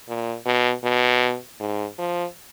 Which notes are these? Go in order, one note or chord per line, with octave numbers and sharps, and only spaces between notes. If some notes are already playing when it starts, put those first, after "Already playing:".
A#2
B2
B2
G#2
F3